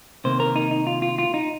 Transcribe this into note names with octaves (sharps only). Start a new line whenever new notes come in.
C3 D#3 A#3 C5
A#4
D#4
D#4
F4
F4
F4
D#4